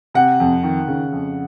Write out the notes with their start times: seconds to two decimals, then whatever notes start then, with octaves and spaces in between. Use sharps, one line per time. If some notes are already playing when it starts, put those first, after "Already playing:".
0.14 C3 F#5
0.40 F2
0.63 D#3
0.88 C#3
1.12 F2